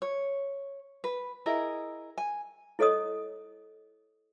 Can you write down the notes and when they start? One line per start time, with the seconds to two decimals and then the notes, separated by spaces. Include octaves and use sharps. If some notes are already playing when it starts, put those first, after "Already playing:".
0.02 C#5
1.04 B4
1.46 E4 G#4 A#4 D#5
2.18 G#5
2.79 E4 A4 C#5 D#5 D#6